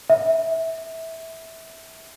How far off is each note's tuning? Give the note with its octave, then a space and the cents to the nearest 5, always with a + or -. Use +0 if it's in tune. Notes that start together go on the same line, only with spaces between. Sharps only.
E5 -20